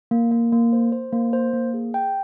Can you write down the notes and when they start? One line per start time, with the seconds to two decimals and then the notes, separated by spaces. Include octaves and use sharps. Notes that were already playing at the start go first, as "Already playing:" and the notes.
0.11 A#3
0.31 A#3
0.53 A#3
0.73 C5
0.92 C5
1.13 A#3
1.33 C5
1.54 A#3
1.74 G#4
1.94 G5